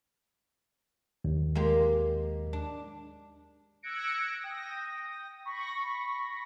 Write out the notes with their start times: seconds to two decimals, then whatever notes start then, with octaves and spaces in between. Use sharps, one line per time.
1.24 D#2
1.55 G#3 A#3 G4
2.53 D4
3.82 E6 F#6 G#6 A#6 C#7 D7
4.40 G5 D#6 A#6
5.45 B5 C#6 A#6